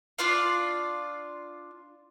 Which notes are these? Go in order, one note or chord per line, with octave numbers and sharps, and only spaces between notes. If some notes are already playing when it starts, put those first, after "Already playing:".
D4 F4 D5 F5